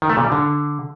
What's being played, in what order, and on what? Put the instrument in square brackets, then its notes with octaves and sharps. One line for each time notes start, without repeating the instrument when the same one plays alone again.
[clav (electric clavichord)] D#3
A3
A#2
G3
D3